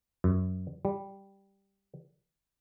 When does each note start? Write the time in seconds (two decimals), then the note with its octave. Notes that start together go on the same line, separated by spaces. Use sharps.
0.24 F#2
0.85 G3